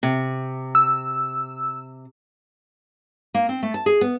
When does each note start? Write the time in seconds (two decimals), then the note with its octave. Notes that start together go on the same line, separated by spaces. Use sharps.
0.03 C3
0.75 E6
3.34 A#3
3.49 C4
3.62 A3
3.74 A5
3.86 G#4
4.01 B3